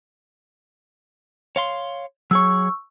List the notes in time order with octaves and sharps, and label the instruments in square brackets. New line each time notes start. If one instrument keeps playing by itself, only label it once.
[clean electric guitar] C#5 F5 C6
[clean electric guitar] F#3 G#4 C#5 [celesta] C#6 E6